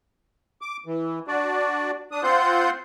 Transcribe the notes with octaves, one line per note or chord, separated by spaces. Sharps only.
D6
E3
D4 F#4 D5
D4 D#6
C4 F4 C5 F#5 C6 G6